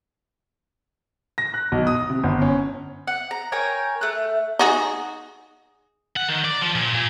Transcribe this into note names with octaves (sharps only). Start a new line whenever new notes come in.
A#6
F#6
B1
D#6
C3
G1
C#4
F#5
A#5
A#4 C#5 G5 G#5
A3 F#6
D#4 F#4 G#4
F#5
D#3
D5
F3
A#2
A#2